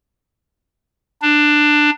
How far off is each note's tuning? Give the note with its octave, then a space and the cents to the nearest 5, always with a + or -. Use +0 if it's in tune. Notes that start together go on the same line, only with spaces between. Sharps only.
D4 +15